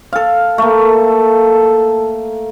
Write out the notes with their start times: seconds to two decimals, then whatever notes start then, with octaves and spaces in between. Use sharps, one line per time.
0.13 A4 F5
0.58 A3 A#3 A4